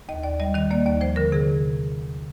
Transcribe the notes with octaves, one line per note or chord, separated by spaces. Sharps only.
D#2 D#5
D#2 D5
G3 D#5
D#3 D#5
A#3 D5
D#2 D5
F3 C5
D3 A#4
C3 G#4